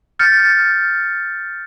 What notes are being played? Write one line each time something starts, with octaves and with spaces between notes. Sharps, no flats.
F6 G6 A6 C#7